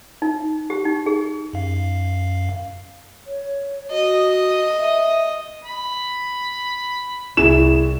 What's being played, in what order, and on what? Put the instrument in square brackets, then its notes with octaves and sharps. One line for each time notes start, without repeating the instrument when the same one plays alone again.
[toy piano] D#4
G4
D#4
G#4
[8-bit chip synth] F#2 F5
[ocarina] C#5
[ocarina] F#4 [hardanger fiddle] D#5
[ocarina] E5
[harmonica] B5
[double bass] C2 [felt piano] E4 G#4 [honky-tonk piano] E7